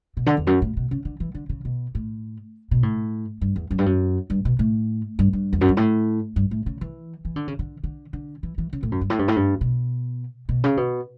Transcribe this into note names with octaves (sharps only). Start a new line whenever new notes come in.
B2
D3
E2
F#2
A2
B2
C#3
D3
E3
D3
C#3
B2
A2
B2
A2
G2
E2
F#2
G2
F#2
G2
B2
A2
G2
G2
E2
F#2
G2
A2
G2
A2
C#3
E3
E3
D3
C#3
D3
D3
D3
E3
E3
C#3
A2
F#2
G2
A2
G2
A2
G2
B2
B2
C#3
B2